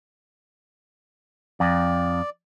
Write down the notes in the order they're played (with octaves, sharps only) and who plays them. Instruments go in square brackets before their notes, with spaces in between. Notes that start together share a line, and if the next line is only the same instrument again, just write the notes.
[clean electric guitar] F2 [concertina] D5